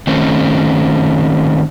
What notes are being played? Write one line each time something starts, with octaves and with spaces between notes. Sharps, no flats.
D#3 A3 C4 C#4